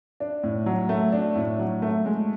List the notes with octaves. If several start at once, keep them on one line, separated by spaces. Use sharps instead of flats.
D4
A2
F#3
A3
D4
A2
F#3
A3
G#3